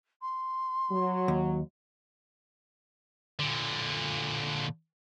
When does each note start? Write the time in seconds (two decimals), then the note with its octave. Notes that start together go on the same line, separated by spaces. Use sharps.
0.22 C6
0.92 F#3
1.28 D#2
3.39 A#2 D3